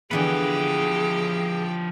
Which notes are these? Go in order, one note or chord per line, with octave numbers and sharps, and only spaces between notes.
D3 E3 F3 B3 G4 G#4 B4 G5